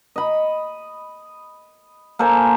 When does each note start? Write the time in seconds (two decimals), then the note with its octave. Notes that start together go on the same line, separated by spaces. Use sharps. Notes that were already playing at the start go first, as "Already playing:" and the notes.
0.16 D#5 B5
2.19 A#3 A4 C5 G#5